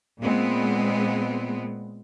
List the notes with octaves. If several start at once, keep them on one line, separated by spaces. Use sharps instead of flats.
A#2 G#3 B3 C4